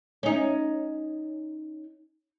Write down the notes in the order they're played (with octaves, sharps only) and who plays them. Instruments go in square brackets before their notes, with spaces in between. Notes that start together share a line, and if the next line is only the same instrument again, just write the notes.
[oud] C#4 D#4